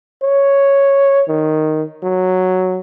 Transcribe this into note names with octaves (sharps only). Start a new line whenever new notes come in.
C#5
D#3
F#3